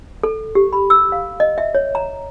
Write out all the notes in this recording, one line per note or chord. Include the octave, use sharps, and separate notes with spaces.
A4
G4
B5
E6
F5
D#5
E5
C#5
A#5